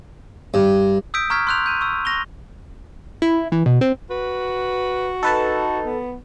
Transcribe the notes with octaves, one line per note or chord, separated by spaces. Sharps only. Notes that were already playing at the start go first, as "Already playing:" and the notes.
G2
D#6 E6 G6 B6 D7
A#5 C#6 F6 G#6 B6
C6 E6 F#6 G6 F7
G6 D#7
C#6 E6
C#6 A#6 F7 G7
E4
E3
B2
C4
F#4 B4
D#4 A4 B4 A5
B3